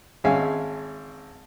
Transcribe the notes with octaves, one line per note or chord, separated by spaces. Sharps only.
G#1 G#3 C#4 E5 F5 G#5